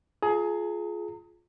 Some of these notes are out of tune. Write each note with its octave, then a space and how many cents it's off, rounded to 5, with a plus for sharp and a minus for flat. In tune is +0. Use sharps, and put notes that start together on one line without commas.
F4 +0 G#4 +25 A#5 -30